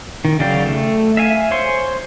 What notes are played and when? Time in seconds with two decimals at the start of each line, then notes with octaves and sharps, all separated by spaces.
0.25 D#3
0.39 C#3 F#3 D5 F5 G5
0.66 A3
1.17 E5 F5 G#5
1.51 C5 C#5 C6